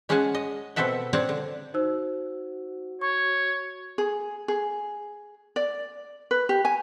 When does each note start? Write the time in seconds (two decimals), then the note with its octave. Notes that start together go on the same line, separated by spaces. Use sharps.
0.09 G#3 C#4 G#4 F#5 G#5 A5
0.35 D#5
0.76 B2 C4 A4 E5 F#5
1.13 C4 D4 C#5 D5 A5 A#5
1.29 D3
1.74 D#4 F#4 C5 E6
3.01 C#5 C#6
3.98 G#4
4.48 G#4
5.56 D5
6.31 B4
6.49 G4
6.65 G#5